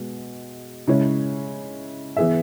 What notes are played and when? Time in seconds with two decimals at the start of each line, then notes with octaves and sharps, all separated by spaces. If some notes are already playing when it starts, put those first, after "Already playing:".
Already playing: B2 G#3
0.87 C#3 G#3 E4 C#5
2.17 E3 B3 G#4 E5